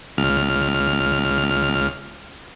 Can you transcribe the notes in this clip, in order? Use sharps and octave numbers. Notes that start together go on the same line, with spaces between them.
C#2 F6